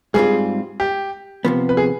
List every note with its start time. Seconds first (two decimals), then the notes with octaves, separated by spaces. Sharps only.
0.14 G#2 G3 C4 F4 G#4
0.80 G4
1.45 C3 F3 B3
1.69 B4
1.77 G#4